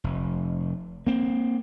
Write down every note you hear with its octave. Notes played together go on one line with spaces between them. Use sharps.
F1
A#3 C4